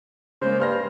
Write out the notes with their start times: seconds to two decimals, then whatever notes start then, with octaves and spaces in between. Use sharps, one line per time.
0.42 C#3 G#3 A#3 C5
0.60 G2 C6 F6 A#6